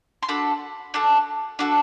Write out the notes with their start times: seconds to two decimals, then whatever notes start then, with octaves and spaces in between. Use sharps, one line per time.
0.23 C6
0.28 D4 F#4 A4 B5
0.94 D4 F#4 A4
1.59 D4 F#4 A4